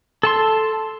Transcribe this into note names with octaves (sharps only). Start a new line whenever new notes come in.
A4 A5 C6